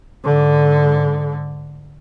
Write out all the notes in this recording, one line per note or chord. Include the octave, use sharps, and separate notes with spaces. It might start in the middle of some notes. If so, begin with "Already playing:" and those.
G#2 D3